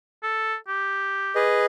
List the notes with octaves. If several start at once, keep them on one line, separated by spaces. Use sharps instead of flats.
A4
G4
G#4 B4 D#5